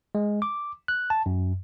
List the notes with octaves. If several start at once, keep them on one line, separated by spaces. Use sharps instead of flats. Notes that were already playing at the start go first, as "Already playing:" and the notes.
G#3
D6
F#6
A5
F#2